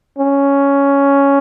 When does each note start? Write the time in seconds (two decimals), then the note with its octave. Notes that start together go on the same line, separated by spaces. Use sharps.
0.18 C#4